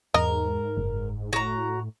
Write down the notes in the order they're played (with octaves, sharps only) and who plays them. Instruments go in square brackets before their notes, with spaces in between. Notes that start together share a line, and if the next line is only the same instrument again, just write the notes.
[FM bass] E2 [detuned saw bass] G#2 [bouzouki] A#4 [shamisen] D#5
[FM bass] F#1
[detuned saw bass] A2 [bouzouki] F#4 A#5